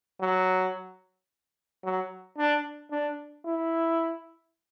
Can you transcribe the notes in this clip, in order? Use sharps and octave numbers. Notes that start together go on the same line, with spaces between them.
F#3
F#3
D4
D4
E4